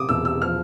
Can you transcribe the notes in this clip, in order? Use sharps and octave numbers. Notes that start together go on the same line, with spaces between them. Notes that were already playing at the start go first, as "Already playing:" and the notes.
Already playing: C3 D6 D#6
E1 E6
E6
F3 F6